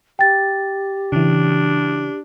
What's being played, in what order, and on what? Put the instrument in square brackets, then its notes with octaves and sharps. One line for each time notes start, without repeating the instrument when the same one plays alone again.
[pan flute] G4 [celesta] G5 A6
[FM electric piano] C#3 E3 [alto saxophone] D4